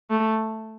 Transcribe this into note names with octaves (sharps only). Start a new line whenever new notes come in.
A3